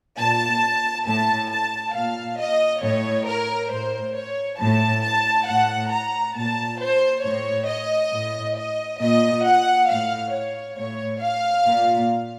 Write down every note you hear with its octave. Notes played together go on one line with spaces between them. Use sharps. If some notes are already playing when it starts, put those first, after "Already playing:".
A#2 A5
A2 A5
A5
A#2 F5
D#5
A2 C#5
A#4
A2 C5
C#5
A2 A5
A5
A2 F#5
A#5
A#2 A5
C5
A2 C#5
D#5
A2
D#5
A#2 D#5
F#5
A2 F5
C#5
A2 C#5
F5
A#2